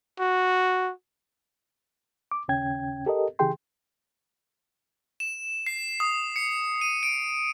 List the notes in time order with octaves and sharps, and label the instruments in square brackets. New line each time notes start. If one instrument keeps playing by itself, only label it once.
[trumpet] F#4
[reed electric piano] D6
D#2 C#3 C#4 G5 G#6
G4 A4 A#4 D#5
C#3 E3 G4 G#4 G5 C6
[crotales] E7
C7
D#6
C#7
D#7
D7